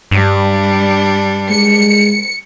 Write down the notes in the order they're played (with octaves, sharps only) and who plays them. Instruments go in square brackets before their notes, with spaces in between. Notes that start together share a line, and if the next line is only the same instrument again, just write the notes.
[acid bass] G2 [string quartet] G3 D4
[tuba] G#3 [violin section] C#7